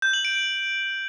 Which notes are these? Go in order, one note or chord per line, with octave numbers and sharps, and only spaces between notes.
G6
F#7
D7